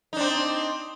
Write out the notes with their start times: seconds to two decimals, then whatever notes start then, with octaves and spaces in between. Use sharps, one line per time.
0.13 D#4
0.17 D4
0.20 C4